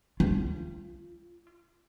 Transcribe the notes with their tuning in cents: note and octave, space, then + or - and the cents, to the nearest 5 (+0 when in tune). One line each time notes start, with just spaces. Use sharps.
F4 -25